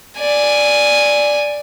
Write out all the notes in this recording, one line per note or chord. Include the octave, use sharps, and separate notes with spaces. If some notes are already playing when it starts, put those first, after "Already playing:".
D5 G#5